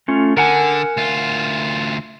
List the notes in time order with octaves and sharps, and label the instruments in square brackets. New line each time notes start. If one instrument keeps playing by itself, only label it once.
[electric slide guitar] A3 C#4 F4
[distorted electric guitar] D3 [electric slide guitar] A#4 F#5 G#5
[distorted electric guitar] D2 F4